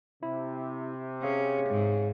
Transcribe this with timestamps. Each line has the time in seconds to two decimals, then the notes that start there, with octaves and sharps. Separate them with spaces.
0.23 C3 E4
1.23 C#4 G#4 C#5 F5
1.70 G#2